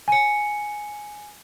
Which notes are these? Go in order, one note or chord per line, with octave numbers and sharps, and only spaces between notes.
G#5 C#7